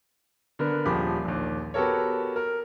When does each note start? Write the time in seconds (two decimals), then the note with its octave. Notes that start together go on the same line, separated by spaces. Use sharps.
0.59 D3 B3 A#4
0.85 D#1 F3 G4 G#4 B5 D6
1.25 A#1 D#2
1.74 B3 F#4 G4 A4 A#4 C#5
2.36 A#4